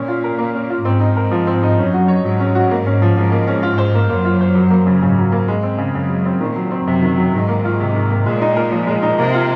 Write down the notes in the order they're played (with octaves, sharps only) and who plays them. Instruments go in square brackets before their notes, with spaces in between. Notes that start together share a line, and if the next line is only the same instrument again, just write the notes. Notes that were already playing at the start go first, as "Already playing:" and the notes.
Already playing: [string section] A#2 [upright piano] C#4
[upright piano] F4
A#4
A#3
C#4
F4
[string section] G#2 [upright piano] C4
[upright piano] D#4
A#4
F3
C4
D#4
[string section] F#2 [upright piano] C#4
[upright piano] F#4
C#5
[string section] G#2 [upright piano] F#3
[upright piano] C#4
F#4
A#3
C#4
F3
[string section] G#2 [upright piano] F3
[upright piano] A#3
C#4
F4
C5
A#3
[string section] F#2 [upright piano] A#3
[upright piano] F4
C5
F#3
A#3
C#3
[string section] G#2 [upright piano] C#3
[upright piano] F#3
A#3
G#3
C4
C#3
[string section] F#2 [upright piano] C#3
[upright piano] G#3
C4
[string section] A#2 [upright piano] D#3
[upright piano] F#3
C4
[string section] F#2 [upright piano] C3
[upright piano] D#3
F#3
[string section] G#2 [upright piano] D#3
[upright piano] A#3
F4
C3
D#3
A#3
[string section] A#2 [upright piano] G#3
[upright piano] D#4
A#4
F3
G#3
D#4
[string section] C3 [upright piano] A#3
[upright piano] F4